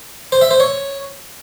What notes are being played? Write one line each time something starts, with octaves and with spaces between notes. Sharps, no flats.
C5
E5
C5
C#5